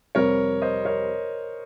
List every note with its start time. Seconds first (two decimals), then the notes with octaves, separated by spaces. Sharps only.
0.15 F2 C3 G3 C4 A#4 C#5
0.62 C5 D#5
0.85 A#4 C#5